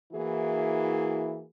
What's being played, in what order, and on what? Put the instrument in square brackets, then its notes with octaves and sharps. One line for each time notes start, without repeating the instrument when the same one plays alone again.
[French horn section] E3 A#3 E4 F#4 G#4